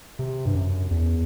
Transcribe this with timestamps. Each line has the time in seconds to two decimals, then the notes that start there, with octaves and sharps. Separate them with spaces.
0.19 C3
0.45 G2
0.55 F#2
0.91 E2